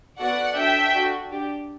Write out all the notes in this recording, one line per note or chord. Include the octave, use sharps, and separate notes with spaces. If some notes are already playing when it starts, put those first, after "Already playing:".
B3 F#4 A4 D5 F#5
D4 F#4 A4 E5 G5
D4 F#4 A4
D4 G4